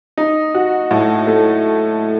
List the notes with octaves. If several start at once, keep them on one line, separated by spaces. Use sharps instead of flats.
D#4
F#4
A2
A3